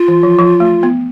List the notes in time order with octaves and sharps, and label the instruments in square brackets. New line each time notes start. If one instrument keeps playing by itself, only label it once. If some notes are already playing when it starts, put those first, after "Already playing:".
Already playing: [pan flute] F4
[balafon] E3
F3
F3
A3
B3